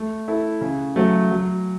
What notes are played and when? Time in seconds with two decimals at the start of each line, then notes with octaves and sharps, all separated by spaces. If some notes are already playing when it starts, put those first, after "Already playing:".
Already playing: A3
0.28 E4 A4
0.61 C#3
0.96 F#3 A3
1.30 F#3